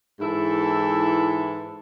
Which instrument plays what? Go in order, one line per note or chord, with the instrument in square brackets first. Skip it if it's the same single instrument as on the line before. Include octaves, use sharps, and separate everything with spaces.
[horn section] G#2 E3 E4 A4